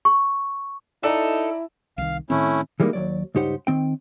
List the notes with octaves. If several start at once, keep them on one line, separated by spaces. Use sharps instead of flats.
C#6
D#4 E4 A4 D5 A#5
C2 D#3 F5
A2 D#3 A3 C4 C#4 E4
E3 G3 G#3 A#3 D#4
D#2 F#3 D5
C#2 G2 D#4 G4 C5 F#5
D#3 C4 G5